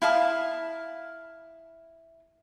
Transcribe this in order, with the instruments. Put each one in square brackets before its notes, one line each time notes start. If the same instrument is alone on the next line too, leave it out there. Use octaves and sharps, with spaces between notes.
[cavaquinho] E4 F5 A5 D#6